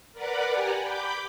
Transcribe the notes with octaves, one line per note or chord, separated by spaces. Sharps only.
A#4 B4 D5 F#5 B5 D6
G4 D5 F#5 G#5 A#5
B5 D6 G6